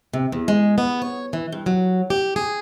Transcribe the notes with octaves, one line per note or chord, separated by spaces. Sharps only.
C3
E2
G#3
B3
C#5
E3
G2
F#3
G4
G#4